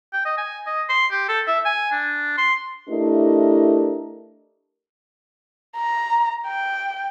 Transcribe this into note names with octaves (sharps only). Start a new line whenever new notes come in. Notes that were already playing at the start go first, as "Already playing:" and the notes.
G5
D#5
G#5
D#5
C6
G4
A4
E5
G#5
D4
C6
A3 D4 E4 G4 A#4 D#5
A#5
G5